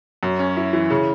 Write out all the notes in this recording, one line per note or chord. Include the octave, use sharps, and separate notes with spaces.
F#2
C#4
E4
E3
C#3